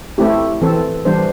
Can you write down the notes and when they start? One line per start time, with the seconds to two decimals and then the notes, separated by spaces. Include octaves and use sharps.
0.18 A3 C4 E4 G4
0.62 E3 C4 A4
1.05 E3 G3 D4 C5